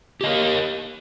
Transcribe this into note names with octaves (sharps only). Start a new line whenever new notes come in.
G4 A#4 D#5